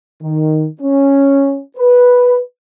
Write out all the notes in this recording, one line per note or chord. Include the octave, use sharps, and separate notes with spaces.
D#3
C#4
B4